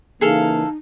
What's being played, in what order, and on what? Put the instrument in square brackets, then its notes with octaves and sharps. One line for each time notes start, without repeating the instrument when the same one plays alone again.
[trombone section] C#3 E3 A#3 [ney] D#4 [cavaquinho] G#4 A4 F5